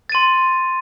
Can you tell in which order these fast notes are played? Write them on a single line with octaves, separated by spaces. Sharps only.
A6 D#7 C6